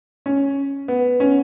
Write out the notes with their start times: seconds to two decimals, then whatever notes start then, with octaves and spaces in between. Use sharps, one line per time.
0.26 C#4
0.88 B3
1.20 C#4